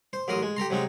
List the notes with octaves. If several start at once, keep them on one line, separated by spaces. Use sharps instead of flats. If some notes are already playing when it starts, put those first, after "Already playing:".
C5
A1 F#3 A#4 C6 D#6
G#3
G4 A4 A#5 C6
C3 F#3 G#3 D#4